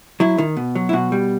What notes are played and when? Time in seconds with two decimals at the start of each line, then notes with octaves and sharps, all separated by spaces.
0.20 F#3 E4
0.38 D#3
0.57 B2
0.75 F#3
0.89 E4
0.93 B2 F#4
1.12 G3